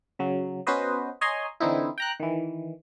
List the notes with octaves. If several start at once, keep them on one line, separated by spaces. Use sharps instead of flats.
C#3 F#3
B3 C#4 F#4 B4 C5 D#5
C#5 D#5 G#5 A#5 C6
D3 E3 C4 D#4 E4
G5 A#5 F#6
D#3 E3